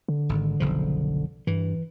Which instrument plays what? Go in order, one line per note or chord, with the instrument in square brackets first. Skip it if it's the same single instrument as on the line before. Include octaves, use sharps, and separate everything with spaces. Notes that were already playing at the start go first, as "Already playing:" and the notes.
[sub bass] D3
[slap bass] G#1
F#1 B1 F3
[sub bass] G2 [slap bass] E3